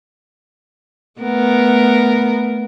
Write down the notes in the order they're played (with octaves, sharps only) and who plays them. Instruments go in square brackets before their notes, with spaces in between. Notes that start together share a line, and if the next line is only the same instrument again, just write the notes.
[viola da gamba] A3 B3 A#4